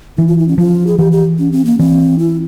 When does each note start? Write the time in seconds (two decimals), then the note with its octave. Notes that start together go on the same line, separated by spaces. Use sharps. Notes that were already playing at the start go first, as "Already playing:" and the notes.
0.18 E3 E4
0.28 F4
0.39 E4
0.48 C#4
0.58 F3 F4
0.87 G#4
0.98 E3 G4
1.12 G4
1.39 C#4
1.52 C4
1.65 A#3
1.79 E3 C4
2.19 E4